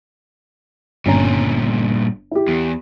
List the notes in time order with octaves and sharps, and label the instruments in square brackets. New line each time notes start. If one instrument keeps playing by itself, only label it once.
[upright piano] G1 C#4 A#5 [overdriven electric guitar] G2 A#2
[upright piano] E4 G4
[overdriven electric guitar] E2